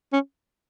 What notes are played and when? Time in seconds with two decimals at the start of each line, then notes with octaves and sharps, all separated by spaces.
0.13 C#4